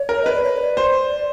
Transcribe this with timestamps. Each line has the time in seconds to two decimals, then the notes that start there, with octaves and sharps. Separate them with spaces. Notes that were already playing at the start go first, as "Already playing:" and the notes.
Already playing: C#5
0.09 A#4
0.23 B4 D#5
0.33 D5
0.44 C#5
0.56 C#5
0.61 D5
0.77 C5